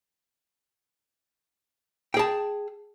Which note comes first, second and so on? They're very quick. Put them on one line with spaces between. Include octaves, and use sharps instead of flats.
G5 G#4 A5